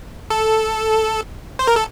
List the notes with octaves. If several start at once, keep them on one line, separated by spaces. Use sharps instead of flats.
A4
C5
A#4
A4